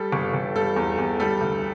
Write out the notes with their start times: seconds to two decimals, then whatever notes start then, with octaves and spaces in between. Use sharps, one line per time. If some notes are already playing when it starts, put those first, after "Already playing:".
Already playing: G3 A4
0.12 G1
0.33 G1
0.56 G3 A4
0.76 E2
0.98 E2
1.20 G3 A4
1.41 D2